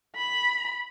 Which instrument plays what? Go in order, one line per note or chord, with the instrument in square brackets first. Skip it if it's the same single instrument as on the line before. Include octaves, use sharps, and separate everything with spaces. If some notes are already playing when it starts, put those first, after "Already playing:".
[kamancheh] B5